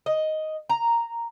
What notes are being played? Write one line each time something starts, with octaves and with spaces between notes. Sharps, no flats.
D#5
A#5